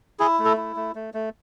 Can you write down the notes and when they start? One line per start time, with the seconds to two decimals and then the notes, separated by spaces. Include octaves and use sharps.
0.19 E4 G#4
0.39 A3
0.45 A4
0.57 E4
0.76 A3
0.95 A3
1.14 A3